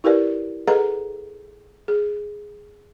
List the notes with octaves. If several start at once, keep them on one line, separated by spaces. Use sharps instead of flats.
E4 G4 A#4 B4 D5
G#4 A4 B4 D#5 F#5 A#5
G#4